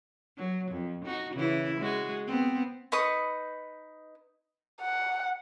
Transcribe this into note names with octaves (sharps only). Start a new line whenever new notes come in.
F#3
F2
D#4 F#4
C#3 E3 E4
G#3 F#4 G#4
B3 C4
D#4 B4 C#6 D#6
F#5